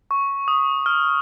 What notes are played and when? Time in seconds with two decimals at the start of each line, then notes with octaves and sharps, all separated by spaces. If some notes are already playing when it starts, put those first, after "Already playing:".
0.11 C#6
0.48 D#6
0.86 F6